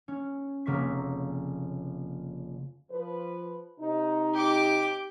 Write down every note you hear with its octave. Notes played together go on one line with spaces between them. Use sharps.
C#4
F1 C#3 A#3 C4 C#6 B6
F3 B4
C3 D#4
G4 D6